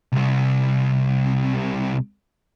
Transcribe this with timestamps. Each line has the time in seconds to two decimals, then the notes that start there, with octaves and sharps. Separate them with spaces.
0.12 C2 C3